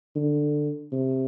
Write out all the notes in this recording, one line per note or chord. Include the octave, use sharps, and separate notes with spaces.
D3
C3